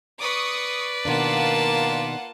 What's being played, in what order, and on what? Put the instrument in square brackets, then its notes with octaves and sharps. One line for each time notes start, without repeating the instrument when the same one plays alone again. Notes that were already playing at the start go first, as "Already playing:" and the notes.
[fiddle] B4 D5 [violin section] C#6 D#6
[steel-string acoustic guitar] B2 D#3 D4 [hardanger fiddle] A#3 A5 [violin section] F4 F#5